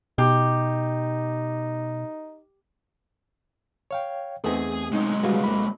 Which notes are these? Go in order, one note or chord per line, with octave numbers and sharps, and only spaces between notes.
B2 D#4 G4
C#5 F5 G5
E2 A3 C4 D#4 G#4 G#5
B1 B2 G#3 C#4 D#4
C#3 G3 F#4 G#4 B4 F5
D2 A#3 B5